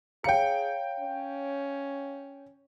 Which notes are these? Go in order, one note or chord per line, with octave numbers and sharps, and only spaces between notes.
G#4 C#5 F5 G5 A#5 C#7
C#4